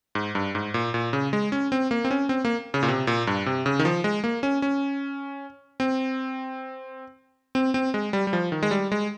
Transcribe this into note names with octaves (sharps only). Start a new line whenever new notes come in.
G#2
G2
G#2
A#2
A#2
C#3
G#3
C#4
C4
A#3
C4
C#4
C4
A#3
C#3
A#2
C3
A#2
G2
C3
C#3
D#3
F3
G#3
A#3
C#4
C#4
C4
C4
C4
G#3
G3
G3
F3
D#3
G#3
G3
G#3